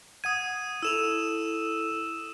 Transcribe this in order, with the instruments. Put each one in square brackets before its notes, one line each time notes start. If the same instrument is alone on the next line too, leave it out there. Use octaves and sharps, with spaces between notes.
[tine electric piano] F#5 G#6 [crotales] D#6 D#7
[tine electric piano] E4 A4 [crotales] E6 E7 F7